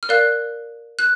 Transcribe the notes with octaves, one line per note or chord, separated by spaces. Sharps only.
F6
A#4 D5 F5 F#6
F#6